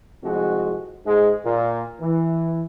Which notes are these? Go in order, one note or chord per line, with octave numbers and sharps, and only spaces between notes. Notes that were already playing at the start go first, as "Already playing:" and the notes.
C2 F2 G#3 F#4
G#2 G#3
A#2
E3